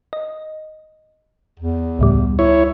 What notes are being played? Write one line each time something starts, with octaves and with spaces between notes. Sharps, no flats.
D#5
E2
C#2 A2 G3
E4 C#5